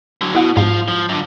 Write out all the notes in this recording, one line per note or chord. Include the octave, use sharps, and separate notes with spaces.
D3 F#3
B2 E4 F#4
G#2 F3 F4
F3
F#2 D3